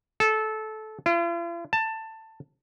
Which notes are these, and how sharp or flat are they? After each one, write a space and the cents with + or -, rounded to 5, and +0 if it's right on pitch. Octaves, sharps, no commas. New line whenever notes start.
A4 -20
F4 -45
A5 +15